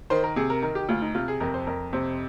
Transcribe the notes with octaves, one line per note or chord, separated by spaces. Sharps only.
D#3 C5
A#4
C3 G#4
A#4
D#3 A#4
G4
D2 F4
D#4
C3 F4
G#4
F2 A#4
C5
F2 A#4
C3 C5